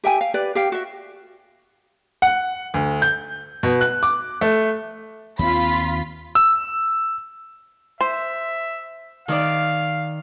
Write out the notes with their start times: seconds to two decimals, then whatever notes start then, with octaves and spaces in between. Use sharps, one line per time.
0.04 G4 E5 G5 G#5
0.21 F5
0.34 G4 B4 D5
0.55 G4 F5 G5
0.72 F#4 E5
2.22 F#5
2.74 D2
3.02 G6
3.63 B2
3.81 F#6
4.03 D6
4.41 A3
5.39 D#2 C4 F4 B5 B6
6.35 E6
8.01 C5 E5
9.28 D#3 D#4 D5 F5